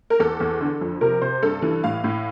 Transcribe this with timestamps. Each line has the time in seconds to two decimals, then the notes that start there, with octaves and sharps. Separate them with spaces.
0.10 A#4
0.20 E2 A4
0.40 E2
0.61 D3
0.81 F2
1.01 C3 A#4
1.22 C3 C5
1.42 G2 A4
1.62 E3
1.84 A2 F5
2.04 A2